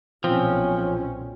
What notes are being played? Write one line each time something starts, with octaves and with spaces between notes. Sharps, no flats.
B1 A#2 F3 C4 C#4